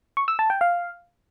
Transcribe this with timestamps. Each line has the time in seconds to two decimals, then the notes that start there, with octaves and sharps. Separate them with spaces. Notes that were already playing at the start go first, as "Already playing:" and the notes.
0.17 C#6
0.28 E6
0.39 A5
0.50 G5
0.61 F5